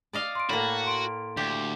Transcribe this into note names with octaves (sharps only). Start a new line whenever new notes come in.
D5 D#5 F5
C6 D7
A2 A#3 F#4 B5
C6 D7
D2 G4